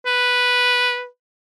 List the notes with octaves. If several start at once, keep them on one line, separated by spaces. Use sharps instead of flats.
B4